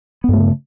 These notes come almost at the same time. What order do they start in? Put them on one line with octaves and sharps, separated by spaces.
B3 G2 A3 C#3